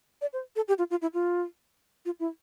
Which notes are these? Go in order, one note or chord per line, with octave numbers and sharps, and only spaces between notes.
D5
C5
A4
G4
F4
F4
E4
F4
F4
E4